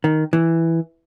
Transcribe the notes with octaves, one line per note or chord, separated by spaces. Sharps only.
D#3
E3